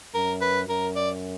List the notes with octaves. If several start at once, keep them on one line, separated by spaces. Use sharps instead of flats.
F#2 A#4
B4
F#2 A#4
D5